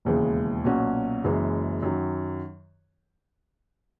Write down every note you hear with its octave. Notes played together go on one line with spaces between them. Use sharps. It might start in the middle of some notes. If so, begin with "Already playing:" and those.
E1 D#2 C#3 E3 G#3
B1 A#2 F#3 C#4 F#4
F#1 F#2 E3 G#3
F#2 D#3 F#3